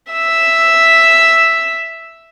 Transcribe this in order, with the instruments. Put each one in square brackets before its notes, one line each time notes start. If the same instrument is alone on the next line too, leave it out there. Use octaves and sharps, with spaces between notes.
[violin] E5 E6